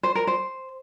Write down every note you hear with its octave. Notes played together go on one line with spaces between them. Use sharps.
C5
A#4
C5